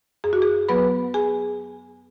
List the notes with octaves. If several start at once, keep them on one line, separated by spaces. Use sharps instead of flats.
F#2 G#4
F#4
G#4
F#3 B3 B4 B5
G#4 G#5